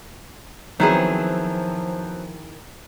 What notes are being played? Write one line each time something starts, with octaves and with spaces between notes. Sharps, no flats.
D#3 F3 F#3 B3 C4 E4 G#4